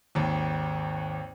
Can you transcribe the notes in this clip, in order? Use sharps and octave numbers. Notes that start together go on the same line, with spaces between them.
G#1 D#2